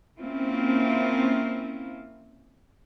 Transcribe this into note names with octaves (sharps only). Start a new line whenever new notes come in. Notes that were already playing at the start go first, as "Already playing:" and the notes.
A#3 C4 C#4 E4 F4